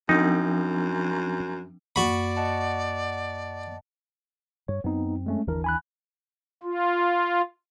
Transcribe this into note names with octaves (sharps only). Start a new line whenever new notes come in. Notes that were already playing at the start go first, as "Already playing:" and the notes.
F#2 F3 C4 D4 D#4
F#2 A#3 F#4 D5 B5
D#5 F#5 A5
G2 C#5
F#2 B3 C4 D#4
G#3 A3 C#4
G1 D#2 E3 D4 A#4
G#5 B5 F#6
F4